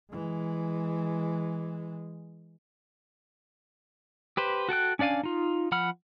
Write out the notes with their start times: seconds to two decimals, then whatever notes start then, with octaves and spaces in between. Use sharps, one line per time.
0.11 E3 G#3
4.37 G4 B4 C5
4.69 F#4 A4 G5 F#6
4.99 C#4 D4 D5 F5 G#5
5.23 D#4 F4
5.72 F3 F#5 B5 F6